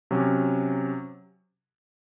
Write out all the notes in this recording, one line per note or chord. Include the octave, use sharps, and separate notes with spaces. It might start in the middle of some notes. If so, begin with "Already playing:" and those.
C3 F#3 C#4